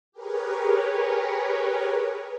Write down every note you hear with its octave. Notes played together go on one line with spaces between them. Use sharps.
G4 G#4 A#4 B4 C#5